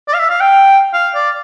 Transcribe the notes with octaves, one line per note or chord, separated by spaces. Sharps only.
D5
F5
E5
F5
G5
F5
D5